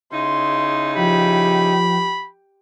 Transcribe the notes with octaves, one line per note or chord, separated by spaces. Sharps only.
C#3 D#4 E4 C6
F3 G4 B5